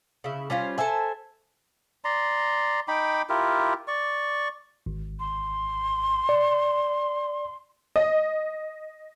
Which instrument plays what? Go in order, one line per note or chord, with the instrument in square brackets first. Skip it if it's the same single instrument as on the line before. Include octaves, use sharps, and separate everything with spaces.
[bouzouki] C#3 E4
G3 C#4 F4 C5
A4 C5 E5 G#5
[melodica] D5 A#5 C6
D#4 G5 B5 D6
E4 F4 G4 A#4
D5 C#6
[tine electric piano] G#1
[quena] C6
[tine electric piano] D5
[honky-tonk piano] D#5